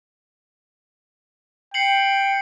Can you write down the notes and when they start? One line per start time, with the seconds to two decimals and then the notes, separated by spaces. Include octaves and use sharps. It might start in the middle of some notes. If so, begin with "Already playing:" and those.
1.74 G5 C7 C#7 F#7